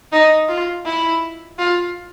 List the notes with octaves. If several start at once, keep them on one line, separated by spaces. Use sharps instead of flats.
D#4
F4
E4
F4